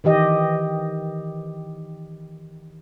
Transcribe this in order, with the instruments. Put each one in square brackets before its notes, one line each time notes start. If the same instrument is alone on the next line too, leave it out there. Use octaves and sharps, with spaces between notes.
[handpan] D#3 E3 G4 D#5